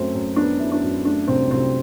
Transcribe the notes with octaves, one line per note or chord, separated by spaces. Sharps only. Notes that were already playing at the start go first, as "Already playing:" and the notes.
Already playing: F#2 A3 C4
F#2
B3 D4
E4
D4
F#2
A3 D4
C2 C4
C2 C4